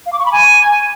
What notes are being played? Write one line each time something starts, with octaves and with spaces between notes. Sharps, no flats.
F5
D6
C#6
B5
G#5